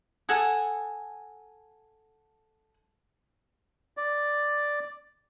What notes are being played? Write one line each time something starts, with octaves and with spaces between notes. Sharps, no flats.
A4 F#5 G#5 D#6
D5